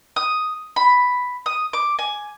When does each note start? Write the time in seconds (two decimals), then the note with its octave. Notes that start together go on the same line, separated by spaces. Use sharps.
0.16 D#6
0.76 B5
1.46 D#6
1.73 D6
1.99 G#5